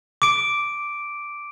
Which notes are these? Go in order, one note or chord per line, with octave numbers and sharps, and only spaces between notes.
D6 D7